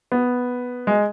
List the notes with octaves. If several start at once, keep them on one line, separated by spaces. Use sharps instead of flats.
B3
G#3